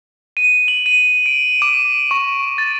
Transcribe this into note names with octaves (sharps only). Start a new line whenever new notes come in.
D#7
F#7
D#7
D7
D6
C#6
A6